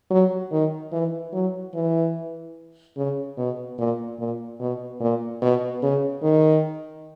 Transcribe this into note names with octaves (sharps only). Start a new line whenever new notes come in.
F#3
D#3
E3
F#3
E3
C#3
B2
A#2
A#2
B2
A#2
B2
C#3
D#3